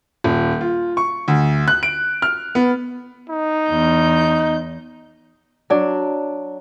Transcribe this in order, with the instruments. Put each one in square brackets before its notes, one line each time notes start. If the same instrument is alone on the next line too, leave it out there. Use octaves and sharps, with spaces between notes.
[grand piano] D#1
F4
C#6
D2
F#6
D7
F6
B3
[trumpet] D#4
[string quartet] E2 G6
[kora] F#3 D4